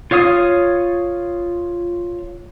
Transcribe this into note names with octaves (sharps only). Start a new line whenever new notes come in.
F4 C#5 F5 D#6